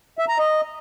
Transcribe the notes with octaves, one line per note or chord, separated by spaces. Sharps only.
E5
A#5
D#5